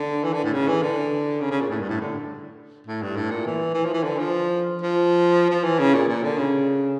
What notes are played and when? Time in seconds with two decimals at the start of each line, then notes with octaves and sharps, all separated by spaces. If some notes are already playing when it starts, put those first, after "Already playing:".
Already playing: D3
0.24 E3
0.33 D3
0.44 A2
0.53 C#3
0.68 E3
0.82 D3
1.40 C#3
1.51 C#3
1.61 A#2
1.70 A2
1.80 G2
1.90 A2
2.00 D3
2.87 A2
3.02 G2
3.16 A2
3.31 A#2
3.46 E3
3.74 E3
3.85 F3
3.94 E3
4.03 D3
4.19 F3
4.81 F3
5.50 F3
5.64 E3
5.79 C#3
5.94 A#2
6.08 A#2
6.23 D3
6.37 C#3